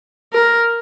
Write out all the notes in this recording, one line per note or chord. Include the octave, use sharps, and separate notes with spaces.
A#4